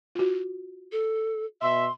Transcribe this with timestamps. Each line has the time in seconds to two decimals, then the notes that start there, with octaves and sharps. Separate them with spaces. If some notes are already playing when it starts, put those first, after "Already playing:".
0.15 F4 F#4
0.92 A4
1.62 B2 E5 C6